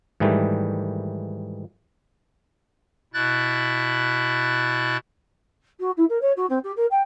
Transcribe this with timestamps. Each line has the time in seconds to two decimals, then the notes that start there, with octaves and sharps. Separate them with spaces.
0.20 G#2 D#3 E3 G3 A3
3.14 B2 E4 F#6 A6
5.79 F#4
5.96 E4
6.09 A#4
6.21 C#5
6.36 F#4
6.49 C4
6.63 G4
6.76 A#4
6.90 G5